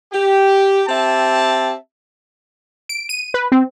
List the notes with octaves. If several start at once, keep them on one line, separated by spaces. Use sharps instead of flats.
G4
C4 G4 E5 A5
D7
D#7
B4
C4